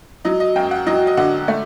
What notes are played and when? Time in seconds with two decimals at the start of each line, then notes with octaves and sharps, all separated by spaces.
0.25 F#3 D#5
0.40 D#5
0.55 F#2 G5
0.71 F#5
0.86 F#3 D#5
1.07 D#5
1.17 D3 F#5
1.48 A3